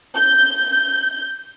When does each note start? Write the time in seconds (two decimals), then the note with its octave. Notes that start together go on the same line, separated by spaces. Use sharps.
0.16 G6